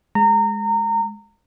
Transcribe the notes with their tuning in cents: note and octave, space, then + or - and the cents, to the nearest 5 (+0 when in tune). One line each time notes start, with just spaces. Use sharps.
G#3 +0 A#5 -25